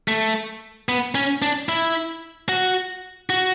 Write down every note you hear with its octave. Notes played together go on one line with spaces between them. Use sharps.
A3
B3
C#4
D4
E4
F#4
F#4